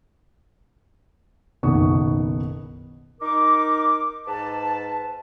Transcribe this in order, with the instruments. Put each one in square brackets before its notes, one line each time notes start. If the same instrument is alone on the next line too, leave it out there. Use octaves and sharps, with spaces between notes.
[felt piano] F#1 B1 D#3 B3 C#6
[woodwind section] D#4 A#4 D6
G#2 B4 A5